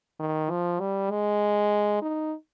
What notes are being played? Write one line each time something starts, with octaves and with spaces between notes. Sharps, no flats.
D#3
F3
G3
G#3
D#4